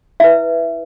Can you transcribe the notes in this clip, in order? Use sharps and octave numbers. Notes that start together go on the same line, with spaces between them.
E4 B4 E5